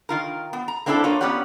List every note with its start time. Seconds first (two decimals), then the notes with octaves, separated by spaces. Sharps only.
0.09 D#3 F4 A#4
0.53 B3
0.68 A#5
0.86 A#3 C4 D4 E4 F4 A4
1.04 A#3 F4 C#5
1.21 A#3 B3 C#4 G4 D5 F#5